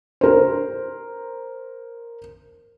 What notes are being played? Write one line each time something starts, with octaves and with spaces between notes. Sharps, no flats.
A#4 C5